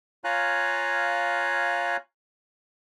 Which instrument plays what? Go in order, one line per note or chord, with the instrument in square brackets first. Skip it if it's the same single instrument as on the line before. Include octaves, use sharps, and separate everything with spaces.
[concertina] F4 C#5 F5 G#5 A#5 F#6